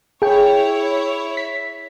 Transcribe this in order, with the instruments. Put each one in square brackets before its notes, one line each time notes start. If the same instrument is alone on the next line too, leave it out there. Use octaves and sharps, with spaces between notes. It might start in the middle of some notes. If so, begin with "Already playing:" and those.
[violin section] E4 C#5 [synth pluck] G#4 G5
[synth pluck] B6